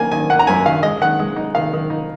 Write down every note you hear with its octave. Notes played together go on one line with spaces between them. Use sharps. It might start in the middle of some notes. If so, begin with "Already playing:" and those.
Already playing: D#3 A#3 G#5
D#3 G#5
A#3 F#5
A#5
F#2 G#5
D#3 F5
G#3 D#5
D#3 F#5
G#3
D#4
D#3 F5
D#3
D#4